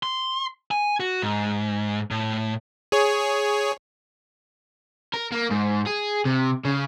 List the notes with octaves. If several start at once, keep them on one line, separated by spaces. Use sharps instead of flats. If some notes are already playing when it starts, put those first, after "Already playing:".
C6
G#5
F#4
G#2
A2
G#4 C#5
A#4
A#3
G#2
G#4
C3
C#3